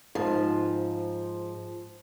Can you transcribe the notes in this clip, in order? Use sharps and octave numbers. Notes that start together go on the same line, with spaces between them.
G#2 F3